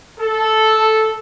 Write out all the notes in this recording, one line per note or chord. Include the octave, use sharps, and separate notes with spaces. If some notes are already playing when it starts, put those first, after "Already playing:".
A4